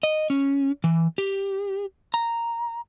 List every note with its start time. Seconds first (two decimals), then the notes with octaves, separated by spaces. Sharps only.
0.03 D#5
0.30 C#4
0.84 E3
1.18 G4
2.14 A#5